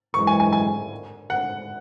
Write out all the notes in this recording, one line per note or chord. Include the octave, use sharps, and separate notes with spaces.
F#2 E3 G#3 C#6
G#5
G#5
G#5
F#5